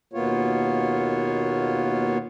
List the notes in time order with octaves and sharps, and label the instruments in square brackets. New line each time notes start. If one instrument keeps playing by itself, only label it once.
[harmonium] D#2 B2 A#3 B3 F4 C#5